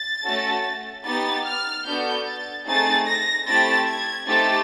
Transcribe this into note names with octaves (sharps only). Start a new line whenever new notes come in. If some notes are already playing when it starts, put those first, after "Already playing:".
Already playing: A6
A3 C#4 F#4 A4
B3 D#4 G4 A6
F6
B3 D4 F#4 A4 G6
A6
A3 C4 D#4 G#4 A6
A#6
A3 C4 E4 G4 A6
G#6
A3 C4 D#4 G4 A6